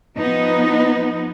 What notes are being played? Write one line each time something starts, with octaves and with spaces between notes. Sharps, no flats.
F3 B3 D#4